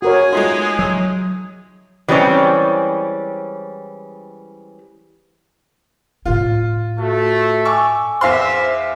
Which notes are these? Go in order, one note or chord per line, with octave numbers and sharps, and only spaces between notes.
F#4 G#4 A#4 C#5
G#3 A3 D#4 F4 C6
F#3
E3 G3 G#3 C4 C#4
A2 E4 F4
A3 F#4
G#5 C#6 D6 E6
E2 C5 E5 F5 C6